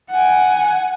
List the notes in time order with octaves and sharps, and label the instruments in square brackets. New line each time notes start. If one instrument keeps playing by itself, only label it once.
[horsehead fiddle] F#5 G#5